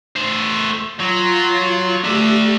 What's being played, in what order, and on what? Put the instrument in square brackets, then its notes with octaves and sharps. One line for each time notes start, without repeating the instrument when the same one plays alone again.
[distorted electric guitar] A3 C5
[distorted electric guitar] F#3 [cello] F4
[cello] A3 G4 [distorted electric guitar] D4 E5